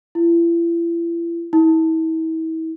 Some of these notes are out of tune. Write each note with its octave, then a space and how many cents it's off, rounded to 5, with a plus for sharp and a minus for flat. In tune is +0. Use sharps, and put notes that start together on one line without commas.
E4 +40
E4 -40